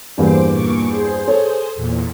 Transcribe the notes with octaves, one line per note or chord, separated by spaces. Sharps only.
E2 G2 A#3 C5 D6
A#2 C#6 D6
G#4 C5
A4 C#5
E2 A#2